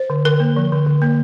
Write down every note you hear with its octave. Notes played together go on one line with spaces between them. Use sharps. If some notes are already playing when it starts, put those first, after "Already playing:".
Already playing: C5
D3
D3 A#4
A#3
F3
D3
D3
A#3